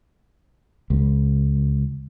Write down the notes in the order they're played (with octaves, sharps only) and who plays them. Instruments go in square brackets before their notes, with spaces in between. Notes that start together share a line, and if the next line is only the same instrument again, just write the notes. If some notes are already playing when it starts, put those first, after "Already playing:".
[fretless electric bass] C#2